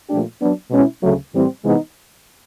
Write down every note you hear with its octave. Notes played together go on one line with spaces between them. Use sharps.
A#2 F3 A3 D4 G4
F#3 B3 D4
B2 G#3 C#4 E4
D2 C#3 F#3 A3
A2 E3 G3 C4
C3 E3 G#3 B3 D#4